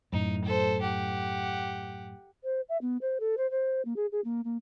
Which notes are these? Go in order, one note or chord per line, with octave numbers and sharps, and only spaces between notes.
F#2 A2 D#4
A4 C5
G4 F#5
C5
E5
B3
C5
A4
C5
C5
A#3
G#4
G#4
A#3
A#3